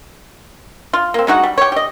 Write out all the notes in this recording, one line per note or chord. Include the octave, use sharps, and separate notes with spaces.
F4
A#3 C4
G#3 D#4 F#4 F#5
G3
G4 C#5
G4 D#5